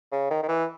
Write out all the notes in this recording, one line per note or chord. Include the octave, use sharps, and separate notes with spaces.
C#3
D#3
D#3
E3